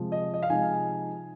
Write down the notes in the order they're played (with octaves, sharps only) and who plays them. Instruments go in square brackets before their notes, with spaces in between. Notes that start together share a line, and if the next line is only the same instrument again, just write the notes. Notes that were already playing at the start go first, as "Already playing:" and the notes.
Already playing: [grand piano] C3 F3 G#3 C4
D#5
D#5
F5
C3 F3 G#3 D#4 G#5